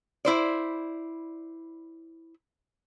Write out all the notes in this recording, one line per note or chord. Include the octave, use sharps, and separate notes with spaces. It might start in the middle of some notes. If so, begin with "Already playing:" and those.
E4 C5 D5